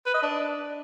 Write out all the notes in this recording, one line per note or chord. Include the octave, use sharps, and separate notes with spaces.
B4
D#5
D4